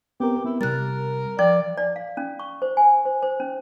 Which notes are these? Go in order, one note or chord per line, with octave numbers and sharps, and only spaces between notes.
B3 C4 G4 A#4
B3 E4
C3 G3 A#4 F#6 A6
F3 D5 G5
D5
F5
C#4
C#6
C5
G#5
C5
C5
C#4